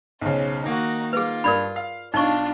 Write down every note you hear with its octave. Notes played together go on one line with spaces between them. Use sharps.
B1 C#3 C5
D#3 A#3 D#4 F#4
F4 G#4 B4
G2 A#4 D5 B5
F5
B1 D4 D#4 F4 C#6 G7